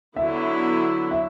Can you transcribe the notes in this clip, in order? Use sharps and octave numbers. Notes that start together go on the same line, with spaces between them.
D3 F#3 B3 E4 E5
E5